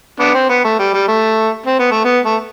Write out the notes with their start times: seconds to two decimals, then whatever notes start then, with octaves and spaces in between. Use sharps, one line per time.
0.20 B3 D4
0.35 C4
0.49 B3
0.64 A3
0.79 G3
0.93 G3
1.08 A3
1.66 C4
1.79 B3
1.91 A3
2.04 B3
2.25 A3